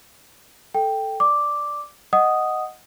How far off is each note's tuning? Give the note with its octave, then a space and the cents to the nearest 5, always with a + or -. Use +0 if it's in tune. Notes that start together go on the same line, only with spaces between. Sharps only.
A4 +0 G5 +0
D5 +0 D6 +0
D#5 +0 F#5 +0 D#6 +0